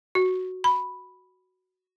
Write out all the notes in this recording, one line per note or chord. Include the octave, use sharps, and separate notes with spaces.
F#4
B5